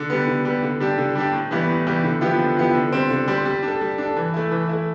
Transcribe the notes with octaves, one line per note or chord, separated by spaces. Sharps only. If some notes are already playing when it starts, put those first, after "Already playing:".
Already playing: D3
G3 B3
D3
G3 B3
D3
G3 D4 G4
D3
G3 D4 G4
A2
E3 G3 B3 E4
A2
E3 G3 B3 E4
D3
F3 B3 E4 G4
D3
F3 B3 E4 G4
D3
G3 C4
D3
G3 C4
G3
D4 A4
G3
D4 A4
E3
A3 E4
E3
A3 E4